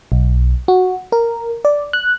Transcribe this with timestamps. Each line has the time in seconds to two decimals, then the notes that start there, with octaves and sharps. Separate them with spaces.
0.12 B1
0.68 F#4
1.12 A#4
1.65 D5
1.93 F#6